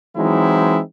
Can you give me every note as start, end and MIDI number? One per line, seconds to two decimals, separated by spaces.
0.17 0.80 52
0.17 0.80 54
0.17 0.80 56
0.17 0.80 60
0.17 0.80 63
0.17 0.80 64